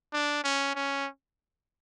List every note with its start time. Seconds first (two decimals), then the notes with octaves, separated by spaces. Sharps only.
0.13 D4
0.44 C#4
0.75 C#4